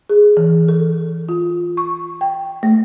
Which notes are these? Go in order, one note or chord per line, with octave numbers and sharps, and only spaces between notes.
G#4
E3
A4
F4
C#6
G5
A3